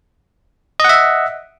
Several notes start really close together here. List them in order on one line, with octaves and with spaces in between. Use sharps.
D#5 F#5 E5